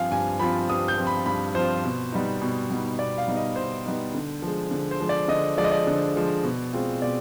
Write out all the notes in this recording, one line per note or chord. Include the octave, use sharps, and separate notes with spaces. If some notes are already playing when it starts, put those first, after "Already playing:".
Already playing: G2 F3 C4 F4 F5 G#5
G2 G#5
F3 C4 F4 B5
G2 D#6
G6
F3 C4 F4
B5
G2 B5
F3 C4 F4 C5
B2
G3 B3 D#4
B2
G3 B3 D#4
B2 D5
F5
G3 B3 D#4
D#5
B2 C5
G3 B3 D#4
D3
F3
G#3
D3
C5
F3 G#3
D5
D3 D#5
F3 G#3 D5
D#5
D5
D3
F3 G#3
B2
G#3 C4 F4
B2 D5